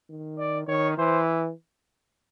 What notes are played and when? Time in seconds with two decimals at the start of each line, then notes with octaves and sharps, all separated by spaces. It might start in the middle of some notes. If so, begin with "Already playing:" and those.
0.10 D#3
0.38 D5
0.68 D#3 C#5
0.98 E3 C5